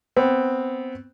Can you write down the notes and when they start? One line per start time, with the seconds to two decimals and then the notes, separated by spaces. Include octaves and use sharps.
0.17 B3 C4